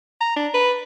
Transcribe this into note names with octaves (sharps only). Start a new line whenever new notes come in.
A#5
D4
B4